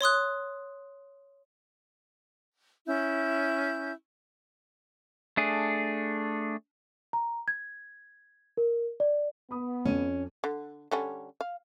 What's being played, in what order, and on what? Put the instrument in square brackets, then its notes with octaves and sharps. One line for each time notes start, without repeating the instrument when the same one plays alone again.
[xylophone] C#5 C6 D#6 F#6
[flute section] C#4 E4 G6
[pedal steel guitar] A3 D4 G#4
[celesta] A#5
G#6
A#4
D5
[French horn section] B3 [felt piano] B5 D#6
[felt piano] F2 D#7 [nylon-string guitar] C#4
[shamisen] D3
D3 G3 C#4
F5